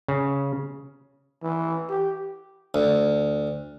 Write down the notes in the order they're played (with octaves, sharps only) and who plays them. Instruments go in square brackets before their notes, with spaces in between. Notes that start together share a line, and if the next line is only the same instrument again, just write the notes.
[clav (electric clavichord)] C#3
[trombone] E3
G4
[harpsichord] D2